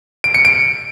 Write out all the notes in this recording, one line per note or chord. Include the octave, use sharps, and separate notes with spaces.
D7
C#7
D7